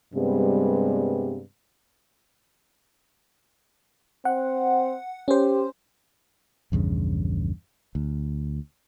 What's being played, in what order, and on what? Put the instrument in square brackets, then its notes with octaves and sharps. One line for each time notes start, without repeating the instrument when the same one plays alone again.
[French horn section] G2 C3 G3 G#3 B3
[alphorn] C4 [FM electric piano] F#5
[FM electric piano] C#4 C5 [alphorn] G4
[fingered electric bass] A#1 E2 G2 C#3
D2